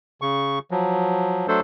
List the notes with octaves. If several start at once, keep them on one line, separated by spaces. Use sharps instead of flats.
C#3 C#6
F3 F#3
F#3 A3 D4 A4 C5